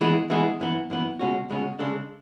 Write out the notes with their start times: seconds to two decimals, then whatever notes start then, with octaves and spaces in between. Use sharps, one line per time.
0.01 E3 G#3 B3 E4 G#4
0.30 E3 G#3 B3 E4 G#4
0.60 F#2 E3 B3
0.90 F#2 E3 B3
1.19 C#2 B2 G#3 C#4 F#4
1.50 C#2 B2 G#3 C#4 F#4
1.79 C#3 G#3 D4 A4